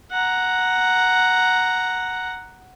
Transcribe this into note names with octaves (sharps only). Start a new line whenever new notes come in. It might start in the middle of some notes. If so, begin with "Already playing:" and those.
F#5 A#5